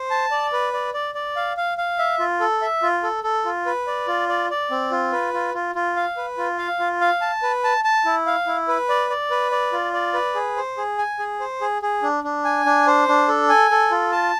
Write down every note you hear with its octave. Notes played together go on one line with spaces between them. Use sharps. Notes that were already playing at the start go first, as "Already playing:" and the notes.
Already playing: C5
A5
D5
B4
D5
D5
D5
F5
F5
F5
E5
F4
A4
E5
F4
A4
A4
F4
B4
D5
F4
D5
D5
C4
F4
B4
F4
F4
F4
F5
B4
F4
F5
F4
F5
A5
B4
A5
A5
E4
F5
E4
B4
D5
D5
B4
D5
F4
D5
B4
G#4
C5
G#4
G#5
G#4
C5
G#4
G#4
D4
D4
G#5
D4
C5
D4
A4
G#5
A4
F4
A5